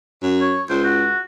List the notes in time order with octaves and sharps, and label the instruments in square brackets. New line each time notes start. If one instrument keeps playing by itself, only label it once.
[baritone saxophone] F#2
[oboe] C#5
[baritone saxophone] C#2 [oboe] C5
[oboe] F#4